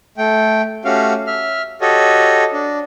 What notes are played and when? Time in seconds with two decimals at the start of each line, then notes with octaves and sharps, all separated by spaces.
0.18 A3 G5
0.85 A3 C#4 F#4 G4 F5
1.27 E5 F6
1.81 F#4 G4 A4 C#5 D#5
2.53 D4